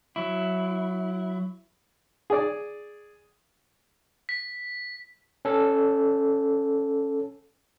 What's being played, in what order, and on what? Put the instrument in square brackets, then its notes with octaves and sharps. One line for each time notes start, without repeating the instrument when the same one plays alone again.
[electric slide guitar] F#3 E4
[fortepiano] G#4 D5
[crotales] B6
[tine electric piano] C#4 A4